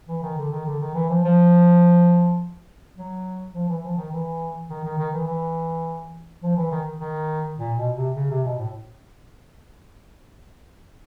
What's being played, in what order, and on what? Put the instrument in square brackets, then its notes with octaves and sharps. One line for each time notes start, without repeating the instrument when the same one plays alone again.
[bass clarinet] E3
D#3
D3
D#3
D3
D#3
E3
F3
F3
F#3
F3
E3
F3
D#3
E3
D#3
D#3
D#3
E3
E3
F3
E3
D#3
D#3
A#2
B2
C3
C#3
C3
B2
A2